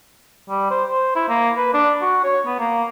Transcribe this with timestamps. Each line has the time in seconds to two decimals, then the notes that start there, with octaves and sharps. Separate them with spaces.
0.50 G3
0.71 C5
0.91 C5
1.16 E4
1.29 A#3
1.57 B4
1.74 D4
2.01 F#4
2.24 C#5
2.46 B3
2.59 A#3